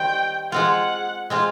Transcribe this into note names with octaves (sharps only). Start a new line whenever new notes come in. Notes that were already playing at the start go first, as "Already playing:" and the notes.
Already playing: D#3 G3 C4 G5
G#3 C4 F4 F#5
G#3 C4 F4